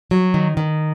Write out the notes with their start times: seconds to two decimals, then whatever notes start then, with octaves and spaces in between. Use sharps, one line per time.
0.11 F#3
0.34 D#3
0.57 D#3